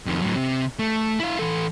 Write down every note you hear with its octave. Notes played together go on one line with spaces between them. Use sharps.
F2 D#3
A2 F#3
C3
A3
E4 F5
E3 A4